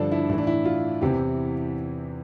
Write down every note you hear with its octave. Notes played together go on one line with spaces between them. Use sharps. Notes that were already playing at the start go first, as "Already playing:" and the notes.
Already playing: G2 D3 F3 D4 A4
E4
A2 E3 E4
D4
E4
F4
E2 C3 E3 G4